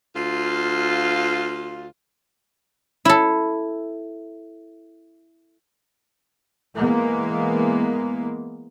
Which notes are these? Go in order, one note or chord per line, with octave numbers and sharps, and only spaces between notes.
D2 F4
E4 A4
E3 G#3 A#3 B3